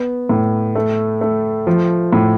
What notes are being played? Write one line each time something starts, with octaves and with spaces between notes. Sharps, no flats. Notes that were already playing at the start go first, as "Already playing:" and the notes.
Already playing: B3
A2
A3
A3
F3
A2